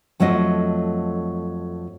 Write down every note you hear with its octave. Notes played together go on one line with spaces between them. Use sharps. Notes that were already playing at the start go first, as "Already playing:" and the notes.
F2 F#3 A3 F4 D#5